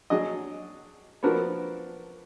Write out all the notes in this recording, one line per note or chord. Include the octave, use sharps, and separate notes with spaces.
F#3 D4 G#4 D#5
F3 B3 D4 F#4 A#4